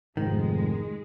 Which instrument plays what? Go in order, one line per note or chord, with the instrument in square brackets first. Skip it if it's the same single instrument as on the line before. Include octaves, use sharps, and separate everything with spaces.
[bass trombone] F1 [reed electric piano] G#2 [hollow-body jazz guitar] D#3 [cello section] G#3